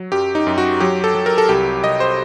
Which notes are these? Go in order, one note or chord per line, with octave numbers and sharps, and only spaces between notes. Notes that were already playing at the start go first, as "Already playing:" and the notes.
Already playing: F#3
F#2 G4
D#4
F#2
F#4
F#3 G4
A4
F#3
A#4
A4
C2 G4
C2 D#5
C5